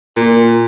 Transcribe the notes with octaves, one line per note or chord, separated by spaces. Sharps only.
A#2